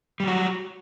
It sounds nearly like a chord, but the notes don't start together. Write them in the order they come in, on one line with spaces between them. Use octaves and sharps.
G3 F#3 F#4